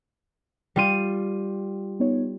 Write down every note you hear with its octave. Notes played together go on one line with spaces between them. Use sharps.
G3 F4 D#7
B3 D#4 C#5